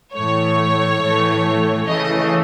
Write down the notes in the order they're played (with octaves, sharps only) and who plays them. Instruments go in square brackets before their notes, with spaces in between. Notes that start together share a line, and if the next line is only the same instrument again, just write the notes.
[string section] A2 E3 A3 C#5
A2 E3 A3
C#3 E3 A3 D#5